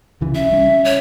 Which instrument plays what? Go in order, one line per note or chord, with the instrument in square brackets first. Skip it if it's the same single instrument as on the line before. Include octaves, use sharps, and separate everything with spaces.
[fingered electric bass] C#2 C#3 E3
[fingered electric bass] C2 C#4 [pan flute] E5
[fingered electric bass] G3 C#4
[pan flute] C#5